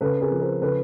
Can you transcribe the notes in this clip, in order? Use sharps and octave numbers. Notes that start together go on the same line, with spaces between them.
C#3 A4 B4
G#4 A#4
F3
A#4 C5
C#3 A4 B4